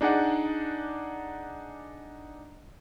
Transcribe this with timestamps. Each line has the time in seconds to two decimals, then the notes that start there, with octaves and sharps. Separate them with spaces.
0.01 D4 D#4 G#4 D5 F#5